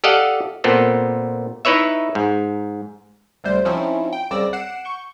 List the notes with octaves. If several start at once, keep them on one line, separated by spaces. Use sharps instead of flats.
G4 A4 D5 D#5 F5 F#5
A#2 B3 C4 A4
D#4 E4 B4 C#5 E5
G#2
D2 C3 G3 C5
F3 C4 C#4 D#4 E4
G5
C2 C#3 D5 E6 A#6
F#5 C7 D7 E7
C#6 G6